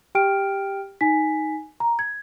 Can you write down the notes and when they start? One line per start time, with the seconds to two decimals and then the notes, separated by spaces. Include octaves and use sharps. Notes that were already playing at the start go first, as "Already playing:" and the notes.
0.15 G4 G5 F6 D7
1.01 D#4 G#5 B6
1.80 A#5
1.99 G#6